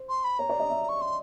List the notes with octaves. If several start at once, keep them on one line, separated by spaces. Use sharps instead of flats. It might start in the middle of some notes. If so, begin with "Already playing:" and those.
Already playing: C5
C6
B5
C#5 A#5
D5
D#5
E5
C#6
C6